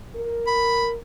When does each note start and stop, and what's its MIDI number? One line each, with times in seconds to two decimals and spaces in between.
0.16 0.96 70
0.47 0.89 83